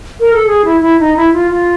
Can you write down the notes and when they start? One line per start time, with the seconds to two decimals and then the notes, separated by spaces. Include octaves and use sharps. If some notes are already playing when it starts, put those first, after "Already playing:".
0.20 A#4
0.33 A4
0.47 G#4
0.65 E4
0.81 E4
1.00 D#4
1.17 E4
1.33 F4
1.51 F4